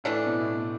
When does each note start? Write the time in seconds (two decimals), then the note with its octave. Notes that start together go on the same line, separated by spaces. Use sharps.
0.04 A2 E3 A3 D4
0.26 B2
0.41 A2
0.47 B2